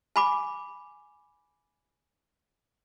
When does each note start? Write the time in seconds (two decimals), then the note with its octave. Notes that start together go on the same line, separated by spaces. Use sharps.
0.16 G#5 B5 D6